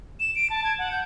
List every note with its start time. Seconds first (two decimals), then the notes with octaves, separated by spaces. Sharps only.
0.20 E7
0.35 D7
0.50 A5
0.64 G#6
0.79 F#5
0.91 G6